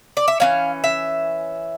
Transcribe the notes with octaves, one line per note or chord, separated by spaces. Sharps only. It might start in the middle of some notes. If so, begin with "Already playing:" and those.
D5
E5
E3 A#3 C#4 F5
E5